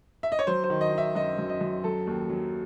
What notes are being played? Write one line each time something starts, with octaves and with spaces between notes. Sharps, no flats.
E5
D#5
C#5
F#3 C5
C5
D#3
D#5
D#3
E5
F#2 D#5
F#2
D#5
F#2
F#3 A4
D#2
F#3